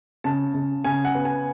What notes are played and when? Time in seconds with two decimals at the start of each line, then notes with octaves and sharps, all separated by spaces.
0.24 C#3 A5
0.54 C#3
0.84 C#3 G#5
1.05 F#5
1.15 B3
1.25 G#5